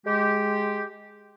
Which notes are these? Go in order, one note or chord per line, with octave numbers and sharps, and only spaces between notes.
G#3 G4